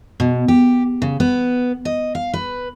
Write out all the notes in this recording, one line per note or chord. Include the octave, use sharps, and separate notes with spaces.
B2
G4
C#3
B3
D#5
F5
B4